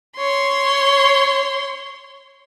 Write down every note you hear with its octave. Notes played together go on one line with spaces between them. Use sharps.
C#5 C6